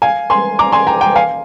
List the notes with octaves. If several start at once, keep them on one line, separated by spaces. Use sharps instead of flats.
F5 G#5
G#5 C6
A#5 D6
G#5 C6
G5 A#5
G5 A#5
F5 G#5